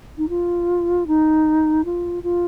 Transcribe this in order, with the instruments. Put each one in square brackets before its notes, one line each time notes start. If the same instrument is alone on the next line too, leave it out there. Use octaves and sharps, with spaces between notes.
[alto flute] D#4
F4
D#4
F4
F4